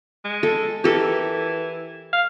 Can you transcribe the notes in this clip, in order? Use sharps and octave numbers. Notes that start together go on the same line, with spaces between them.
G#3
A4
E3 G4 A4 A#4
F5